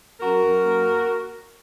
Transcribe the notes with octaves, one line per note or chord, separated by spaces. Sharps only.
F#2 F#4 A#4
F#2
A#3